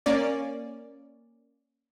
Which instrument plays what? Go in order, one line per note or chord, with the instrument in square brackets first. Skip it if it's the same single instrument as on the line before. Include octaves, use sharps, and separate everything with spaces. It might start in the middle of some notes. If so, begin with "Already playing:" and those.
[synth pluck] A#3 C#4 D5